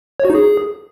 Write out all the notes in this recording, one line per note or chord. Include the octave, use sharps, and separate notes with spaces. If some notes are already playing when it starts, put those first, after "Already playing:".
C#5
F#4
D#4
G#4